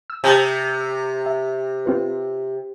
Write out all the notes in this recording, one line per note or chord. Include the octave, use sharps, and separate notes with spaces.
E6
C3 A5 D#6 G6
E5
C4 F4 B4